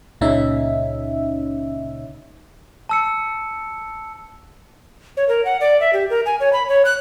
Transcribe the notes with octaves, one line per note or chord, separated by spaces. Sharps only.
C#2 A#2 C#3 C#4 D#4 E5
A5 E6 C#7
C#5
A#4
F#5
D5
E5
G4
A#4
G#5
C#5
B5
C#5
F#6